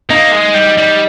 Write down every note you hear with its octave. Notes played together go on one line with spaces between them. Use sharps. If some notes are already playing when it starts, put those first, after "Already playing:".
A#3 D#4
G#3
G3
G3